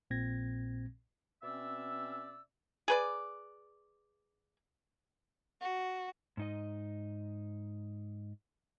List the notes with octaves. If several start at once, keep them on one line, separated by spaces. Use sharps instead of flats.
A#1 A#2 C4 G#6 A#6
B2 C4 C#4 D5 E5 E6
G#4 B4 D5
F#4
G#2 D#4 D#5